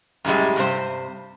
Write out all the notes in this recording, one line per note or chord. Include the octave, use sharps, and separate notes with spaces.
F#2 A2 G3 G#3
G2 C3 C5